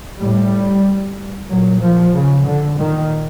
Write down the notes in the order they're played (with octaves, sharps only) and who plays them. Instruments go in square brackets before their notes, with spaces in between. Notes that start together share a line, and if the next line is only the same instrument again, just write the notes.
[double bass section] A2 G3
A#2 F#3
F3
C#3
D3
A#2 D#3